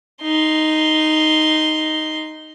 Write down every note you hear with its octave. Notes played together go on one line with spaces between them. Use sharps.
D#4 C6